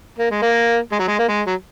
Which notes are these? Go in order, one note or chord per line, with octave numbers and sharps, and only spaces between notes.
A#3
G#3
A#3
G#3
F#3
G#3
A#3
G#3
F#3